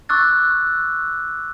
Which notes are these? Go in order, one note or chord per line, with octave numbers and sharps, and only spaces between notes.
C#6 D6 E6 F#6 A6